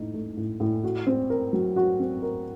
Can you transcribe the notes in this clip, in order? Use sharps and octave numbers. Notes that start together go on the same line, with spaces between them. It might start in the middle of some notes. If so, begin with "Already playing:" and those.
Already playing: A2 D#4
A3
A2
A2
F#4
C4
A#4
F#3
F#4
C4
A#4